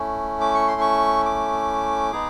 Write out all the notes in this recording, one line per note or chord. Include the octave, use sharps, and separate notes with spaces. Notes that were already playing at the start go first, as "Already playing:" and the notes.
Already playing: A3 C#4 E4
D6
C#6
C6
C#6
D6
G#3 B3 D#4 G#4